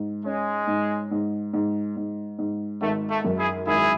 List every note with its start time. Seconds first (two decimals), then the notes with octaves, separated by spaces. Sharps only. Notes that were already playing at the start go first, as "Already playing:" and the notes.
Already playing: G#2
0.25 G#3 C#4
0.67 G#2
1.11 G#2
1.53 G#2
1.96 G#2
2.38 G#2
2.81 G#1 A3
3.10 A3
3.24 F#2
3.38 E4 G#4
3.66 G#1 E4 G#4